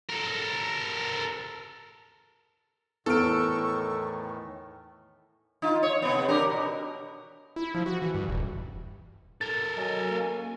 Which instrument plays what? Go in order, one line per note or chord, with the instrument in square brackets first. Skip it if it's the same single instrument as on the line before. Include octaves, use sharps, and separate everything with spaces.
[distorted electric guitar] A4 A#4
[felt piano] E2 F6 D7 [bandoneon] A2 D#3 [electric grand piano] A4 [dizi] C#6
[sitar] D#4 F4
C#5
C3 B3
D4 G4 A#4
B2
[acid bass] E4
F3
F#4
E3
G2
D#1
[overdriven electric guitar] A4 A#4 [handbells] A6
[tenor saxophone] F#3 [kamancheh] D#5 G#5
[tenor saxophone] A#3 [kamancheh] C#4 G#5